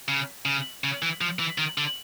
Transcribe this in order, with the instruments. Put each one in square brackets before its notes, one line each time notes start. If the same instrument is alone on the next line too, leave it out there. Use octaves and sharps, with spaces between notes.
[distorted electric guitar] C#3
C#3
C#3
E3
F3
E3
D#3
D3